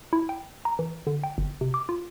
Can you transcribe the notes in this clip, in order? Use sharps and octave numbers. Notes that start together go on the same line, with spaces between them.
E4
G5
A#5
E3
D3
G5
G1
C3
D6
F4